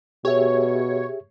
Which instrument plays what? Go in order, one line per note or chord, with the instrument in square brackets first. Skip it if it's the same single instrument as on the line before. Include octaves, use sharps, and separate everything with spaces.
[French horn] B2 [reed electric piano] G4 G#4 E5 [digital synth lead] C#5